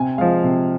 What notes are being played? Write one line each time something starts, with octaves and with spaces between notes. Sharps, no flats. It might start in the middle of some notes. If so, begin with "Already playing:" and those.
Already playing: C3 G#5
F3 G#3 F5
C3